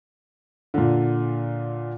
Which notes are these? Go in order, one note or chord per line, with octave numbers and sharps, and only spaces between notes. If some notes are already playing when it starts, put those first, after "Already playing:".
A#2 D3